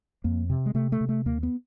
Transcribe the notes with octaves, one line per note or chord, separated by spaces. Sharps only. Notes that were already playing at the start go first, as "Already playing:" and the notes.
F2 A#3
C3
G#3
C3 A3
A3
C3
A3
D#2 A#3
B3